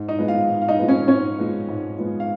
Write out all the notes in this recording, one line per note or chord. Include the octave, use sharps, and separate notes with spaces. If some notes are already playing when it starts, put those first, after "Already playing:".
Already playing: G#2
D#4 D#5
F3 G#3 B3
F4 F5
G#2
F5
D#4 D#5
F3 G#3 B3
C#4 C#5
G#2 C#4 C#5
F3 G#3 B3
G#2
F3 G#3 B3
F5